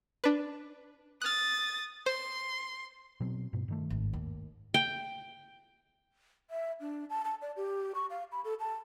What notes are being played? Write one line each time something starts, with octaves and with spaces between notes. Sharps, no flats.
D4 B4
D#6 F6 F#6 A6
C5 C6
B2 F#3 C4
G2 B2
G2 D#3 A3
G#1
D#2
G5
E5
D4
A5
A5
D5
G4
C#6
F5
B5
A4
A5